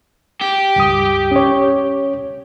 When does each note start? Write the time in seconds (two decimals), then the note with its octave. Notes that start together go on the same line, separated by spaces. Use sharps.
0.42 G4
0.76 C#2 G2 D#6
1.31 C#4 C#5